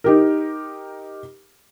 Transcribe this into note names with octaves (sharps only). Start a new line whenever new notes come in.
D#4 G4 A#4